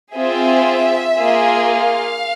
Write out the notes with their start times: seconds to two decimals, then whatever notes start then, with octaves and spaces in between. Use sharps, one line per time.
0.14 C4 F4 G#4 E5
1.19 A#3 F4 G#4
1.70 F5